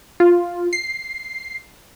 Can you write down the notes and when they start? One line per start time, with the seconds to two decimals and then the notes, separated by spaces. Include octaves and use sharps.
0.20 F4
0.73 C7